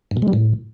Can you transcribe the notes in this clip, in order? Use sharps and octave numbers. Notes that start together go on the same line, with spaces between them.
G2
B2
G#3
G3
A2